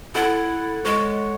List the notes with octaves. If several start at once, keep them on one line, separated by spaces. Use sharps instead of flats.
E4 A4 F#5
G#3 C#5